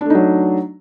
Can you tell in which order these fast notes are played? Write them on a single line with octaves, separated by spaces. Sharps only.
D4 A3 D#4 F#3